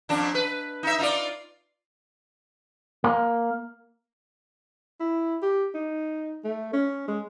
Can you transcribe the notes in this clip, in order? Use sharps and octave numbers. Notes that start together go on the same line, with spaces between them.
F2 A#2 D4
B4
D#4 E5
D#4 F4 D5
A#3
E4
G4
D#4
A3
C#4
G#3